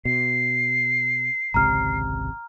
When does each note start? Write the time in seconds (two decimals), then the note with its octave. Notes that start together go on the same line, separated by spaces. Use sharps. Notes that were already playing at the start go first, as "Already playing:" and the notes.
0.05 B2 C7
1.54 G#1 C#2 C3 A#5 F6